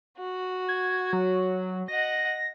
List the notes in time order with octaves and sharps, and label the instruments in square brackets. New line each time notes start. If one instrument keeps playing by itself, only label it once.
[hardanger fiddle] F#4
[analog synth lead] G#6
F#3
[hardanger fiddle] D#5 F#5 [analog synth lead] A#6